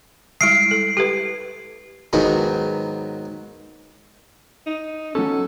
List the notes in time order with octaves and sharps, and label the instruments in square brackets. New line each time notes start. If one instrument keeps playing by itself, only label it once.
[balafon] G3 G#3 E4 [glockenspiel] C7 D7
[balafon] A4
G4 A4 B4
[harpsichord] G#2 D#3 F#3 B3 G#4
[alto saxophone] D#4
[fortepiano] F#3 C#4 [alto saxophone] A4